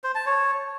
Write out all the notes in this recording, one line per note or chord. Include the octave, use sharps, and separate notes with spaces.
C5
A5
C#5